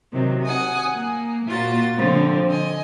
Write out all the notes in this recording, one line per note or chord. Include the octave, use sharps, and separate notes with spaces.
C3 D#3 F#3
F#5 G#5 D#6
A#3
A#2 F4 F#4 A6
D3 F3 C4
D#5 G#5